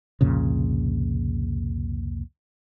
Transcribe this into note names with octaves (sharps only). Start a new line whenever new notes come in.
C2 F2 A#2 C#3